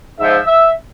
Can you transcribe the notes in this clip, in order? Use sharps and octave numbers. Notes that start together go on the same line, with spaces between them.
G#2 F3 E5
E5